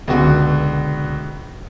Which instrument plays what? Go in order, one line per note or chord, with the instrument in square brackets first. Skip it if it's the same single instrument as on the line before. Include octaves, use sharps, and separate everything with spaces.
[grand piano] C#2 B2 D3 F#4